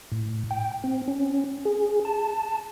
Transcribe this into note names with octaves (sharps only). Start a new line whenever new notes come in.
A2
G5
C4
C#4
G#4
A5